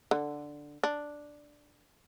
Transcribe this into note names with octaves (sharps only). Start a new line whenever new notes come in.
D3
D4